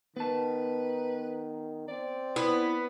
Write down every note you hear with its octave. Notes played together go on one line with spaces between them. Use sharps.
D#3 B3 B4 A5
C4 D5
B3 E4